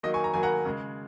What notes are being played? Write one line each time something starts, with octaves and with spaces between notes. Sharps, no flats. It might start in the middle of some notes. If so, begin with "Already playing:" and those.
D#3 F#3 A#3 D#5
G#5 C#6
A#5
D#3 F#3 A#3 G#5
F#5 A#5
C#3 G#3